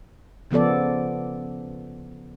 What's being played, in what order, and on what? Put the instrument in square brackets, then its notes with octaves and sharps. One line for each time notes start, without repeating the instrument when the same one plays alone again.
[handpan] C#3 F3 B3 A4 D5